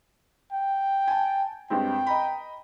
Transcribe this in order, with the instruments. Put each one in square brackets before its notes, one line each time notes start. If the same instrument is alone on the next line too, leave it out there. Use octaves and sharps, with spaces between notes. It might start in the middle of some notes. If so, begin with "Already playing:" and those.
[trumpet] G5
[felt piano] G#5 A5
[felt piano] G2 G#3 C4 [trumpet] G5
[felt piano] D#5 A#5 B5